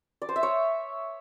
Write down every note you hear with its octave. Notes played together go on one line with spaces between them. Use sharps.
D5
C5
E5
C#5